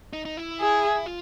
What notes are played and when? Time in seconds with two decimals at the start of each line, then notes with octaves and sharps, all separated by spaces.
0.13 D#4
0.25 D#4
0.37 E4
0.61 G#4
1.06 F4